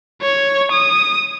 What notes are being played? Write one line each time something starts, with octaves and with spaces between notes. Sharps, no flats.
C#5
D#6